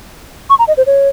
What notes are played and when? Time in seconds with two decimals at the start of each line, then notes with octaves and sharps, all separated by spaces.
0.50 C#6
0.59 A#5
0.68 D#5
0.77 C5
0.87 C#5